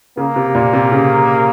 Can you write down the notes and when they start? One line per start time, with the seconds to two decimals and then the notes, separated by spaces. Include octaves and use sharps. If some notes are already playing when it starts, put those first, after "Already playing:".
0.17 C#3 A#3
0.36 C3
0.55 A#2
0.73 C3
0.92 C#3